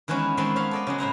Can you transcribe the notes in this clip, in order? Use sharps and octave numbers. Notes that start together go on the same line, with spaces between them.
D#3 E3 G#3 B3 C#4
D#3 G#3 A3 B3 C4 A5
B3 C#5 E5 F5 B5
A4 D5 D#5
C#3 F#3 G#3
A2 E4 C5 A#5